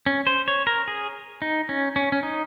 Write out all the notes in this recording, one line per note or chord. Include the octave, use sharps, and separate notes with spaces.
C#4
C5
C#5
A#4
G#4
D#4
C#4
C#4
C#4
D#4